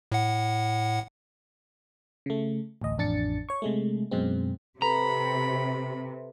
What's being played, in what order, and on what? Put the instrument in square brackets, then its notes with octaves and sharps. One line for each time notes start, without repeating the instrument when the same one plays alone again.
[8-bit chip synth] A2 F#5
[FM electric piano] C#3 A3
A1 D2 D#5
A1 F2 D4 A6 C#7
C#5 C#6
C3 G#3 A3
F#2 B2 G#3 C4
[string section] C3 [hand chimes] A4 B4 [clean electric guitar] A#5 [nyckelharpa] B5